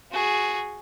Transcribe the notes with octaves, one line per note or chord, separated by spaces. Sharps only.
F#4 G#4